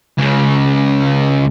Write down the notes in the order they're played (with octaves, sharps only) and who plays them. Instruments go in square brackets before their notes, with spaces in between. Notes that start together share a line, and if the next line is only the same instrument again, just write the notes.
[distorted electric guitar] C#2 C#3